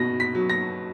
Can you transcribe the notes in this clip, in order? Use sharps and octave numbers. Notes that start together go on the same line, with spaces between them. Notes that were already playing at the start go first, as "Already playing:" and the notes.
Already playing: B2 B3 A#6
B6
F#3
A#6